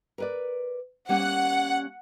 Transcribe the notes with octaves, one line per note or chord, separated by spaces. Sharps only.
A#4 B4 D5
G3 A#3 C#4 F#5